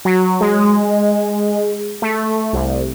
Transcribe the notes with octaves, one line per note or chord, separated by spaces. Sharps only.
F#3
G#3
A3
C2